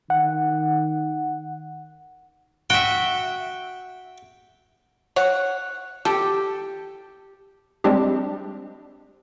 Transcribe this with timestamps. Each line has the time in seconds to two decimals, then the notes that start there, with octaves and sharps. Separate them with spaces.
0.10 D#3 F#5
2.70 F#4 E5 G5
5.16 C#5 F#5
6.05 G4 A4
7.84 G3 G#3 C4 D4 G4